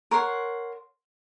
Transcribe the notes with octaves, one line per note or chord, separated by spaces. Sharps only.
A#4 C#5 F#5 C6